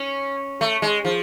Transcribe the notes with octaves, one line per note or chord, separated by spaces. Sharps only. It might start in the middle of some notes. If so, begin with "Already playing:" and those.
Already playing: C#4
A3
G#3
F3